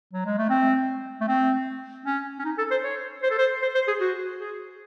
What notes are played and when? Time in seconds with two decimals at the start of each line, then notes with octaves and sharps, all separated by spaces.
0.13 F#3
0.26 G#3
0.38 A3
0.50 C4
1.21 A3
1.28 C4
2.06 C#4
2.39 C#4
2.45 D#4
2.58 A4
2.71 C5
2.83 C#5
3.23 C5
3.31 A4
3.38 C5
3.62 C5
3.75 C5
3.88 G#4
4.01 F#4
4.40 G#4